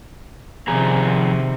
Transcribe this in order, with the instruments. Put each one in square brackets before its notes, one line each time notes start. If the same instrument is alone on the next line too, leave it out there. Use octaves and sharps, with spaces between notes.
[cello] C3 D#3 [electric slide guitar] F3 G#4 A#5